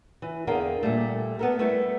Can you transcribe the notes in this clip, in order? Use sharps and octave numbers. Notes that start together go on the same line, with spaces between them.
E3
E2 D3 G#4 A#4 F5 G5
A#2 G3 A3
B3 A4 A#4
G3 A3 B3 E4